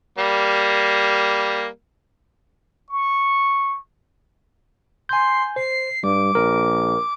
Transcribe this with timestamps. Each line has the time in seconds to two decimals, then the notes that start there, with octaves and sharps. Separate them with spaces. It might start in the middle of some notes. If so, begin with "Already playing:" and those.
0.18 G3 A#3
2.90 C#6
5.09 G#5 C6 G6
5.56 C5 C7
6.04 G2 G3 D6
6.35 A#1 A#4